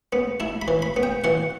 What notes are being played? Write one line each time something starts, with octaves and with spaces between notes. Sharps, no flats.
B3
E4 A5
B5
E3
B5
B3
G5
E3 F#5